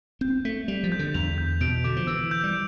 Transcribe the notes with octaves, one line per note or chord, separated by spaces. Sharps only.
C4 G6
A3 B6
G3 F7
F3
G6
D3
E2 F7
G6
B2 D7
D3 D6
F3
E3 E6
G6
G3